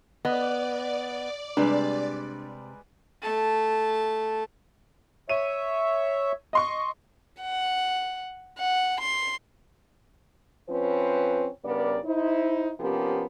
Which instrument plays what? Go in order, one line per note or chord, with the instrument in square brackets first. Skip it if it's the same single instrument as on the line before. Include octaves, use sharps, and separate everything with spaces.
[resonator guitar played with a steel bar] B3 [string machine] D5 [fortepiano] D#5
[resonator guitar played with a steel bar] C3 [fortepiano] G3 G#3 B4 [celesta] D4
[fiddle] A3 A5
[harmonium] C#5 E5 [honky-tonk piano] D#7
[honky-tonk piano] D#5 C6 C#6
[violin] F#5
F#5
C6
[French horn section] F3 C4 C#4 B4
G2 C#3 B3 A#4 D5
D#4 E4 C5
C3 F3 B3 C#4 G4 A#4